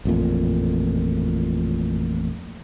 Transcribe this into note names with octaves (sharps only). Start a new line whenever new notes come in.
A1 F2 A#2